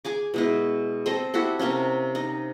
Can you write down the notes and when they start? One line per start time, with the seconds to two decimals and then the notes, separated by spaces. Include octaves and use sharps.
0.05 G#4 G#5 D6
0.34 B2 G#3 E4
1.06 C4 A4 C5 D#5
1.34 E4 F#4 G4 A4
1.59 C3 A#3 C4 C#4
2.15 D#4